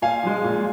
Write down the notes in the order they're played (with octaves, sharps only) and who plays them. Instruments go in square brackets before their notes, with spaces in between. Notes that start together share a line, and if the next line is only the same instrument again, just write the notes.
[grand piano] A#2 F5 G#5
F3 G#3
A#2